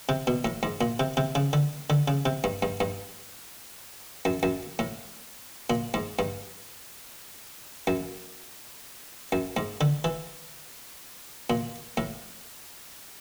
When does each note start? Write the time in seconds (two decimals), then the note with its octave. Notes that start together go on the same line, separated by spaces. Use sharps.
0.09 C3
0.27 B2
0.45 A2
0.63 G#2
0.81 A#2
1.00 C3
1.17 C3
1.35 C#3
1.53 D3
1.90 D3
2.08 C#3
2.25 C3
2.44 G2
2.63 G2
2.80 G2
4.25 F#2
4.43 F#2
4.79 A2
5.70 A#2
5.94 G#2
6.19 G2
7.87 F#2
9.32 F#2
9.57 G#2
9.81 D3
10.04 E3
11.50 A#2
11.97 A2